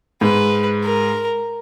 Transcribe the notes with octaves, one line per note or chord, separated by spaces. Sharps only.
G#2 B4
A#4